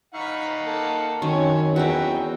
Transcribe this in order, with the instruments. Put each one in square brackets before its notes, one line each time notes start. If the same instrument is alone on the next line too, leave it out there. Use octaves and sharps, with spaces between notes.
[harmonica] D#4 F5 F#5 [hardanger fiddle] B5 C#6
[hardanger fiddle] A#3 A4
[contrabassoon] F#2 [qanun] D#3 [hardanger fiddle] C4 C#4 [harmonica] C#5
[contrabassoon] E2 [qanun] C#4 F#4 [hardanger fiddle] D#4 [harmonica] E5 G5